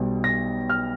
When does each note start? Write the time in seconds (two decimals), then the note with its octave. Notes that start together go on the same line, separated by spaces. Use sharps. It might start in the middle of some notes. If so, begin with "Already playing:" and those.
Already playing: B1 B2 G3
0.24 A#6
0.69 F6